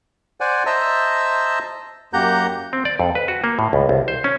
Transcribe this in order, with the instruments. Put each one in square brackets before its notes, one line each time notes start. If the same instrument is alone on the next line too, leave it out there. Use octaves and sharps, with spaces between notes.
[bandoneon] C5 D5 F#5 G#5
C5 D#5 E5 A5 A#5 E6
F#2 A#3 G4 F#5 A#5 G6
[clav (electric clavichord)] C4
D5
F2
B4
F#4
A#3
A2
C#2
C2
C5
C#4